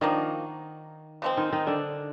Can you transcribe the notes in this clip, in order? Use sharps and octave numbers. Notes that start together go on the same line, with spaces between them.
D#3 F3 A#3 D4 D#4 F#4
C#3 F3 G#3 C4
D#3 D#4
D#3 D#4
D3 D4